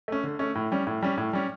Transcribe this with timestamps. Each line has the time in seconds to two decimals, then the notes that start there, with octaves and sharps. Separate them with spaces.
0.08 A3 C#4
0.24 D3
0.39 A3 C#4
0.55 A2
0.72 G3 C#4
0.87 A2
1.02 G3 C#4
1.18 A2
1.33 G3 C#4